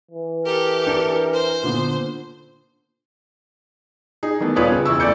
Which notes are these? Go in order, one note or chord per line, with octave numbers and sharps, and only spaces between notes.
E3
G4 A4 A#4
D4 G6
C5
A#2 D3 B3
D#4 G#4
D#3 E3 A3 B3
D#1 F4 B4 C#5 D5 D#6
C#3
E1 E4 C#6 E6
F#1 A3 D5 D6 G6 C#7